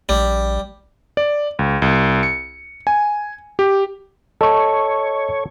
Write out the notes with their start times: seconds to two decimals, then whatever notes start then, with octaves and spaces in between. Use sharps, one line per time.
0.09 A#1 G3
1.17 D5
1.59 C#2
1.82 C2
2.23 C#7
2.87 G#5
3.59 G4
4.41 A4 C#5 D#5 C#6